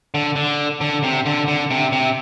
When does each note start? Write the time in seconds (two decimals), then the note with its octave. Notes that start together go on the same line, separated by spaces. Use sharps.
0.14 D3
0.36 D3
0.81 D3
1.04 C3
1.26 D3
1.48 D3
1.71 C3
1.93 C3